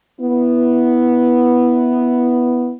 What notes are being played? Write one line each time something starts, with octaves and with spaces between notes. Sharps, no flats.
B3 E4